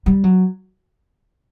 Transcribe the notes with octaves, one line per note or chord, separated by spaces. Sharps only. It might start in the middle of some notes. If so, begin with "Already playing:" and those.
G3
F#3